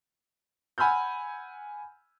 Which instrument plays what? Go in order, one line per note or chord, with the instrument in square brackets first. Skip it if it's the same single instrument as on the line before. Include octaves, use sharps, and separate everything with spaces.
[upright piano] F#5 G#5 B5 E6 F6 G6